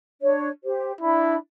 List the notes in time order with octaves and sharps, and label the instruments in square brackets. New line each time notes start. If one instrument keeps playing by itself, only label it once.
[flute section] D4 C#5
G4 C5
[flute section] D4 B5 [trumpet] E4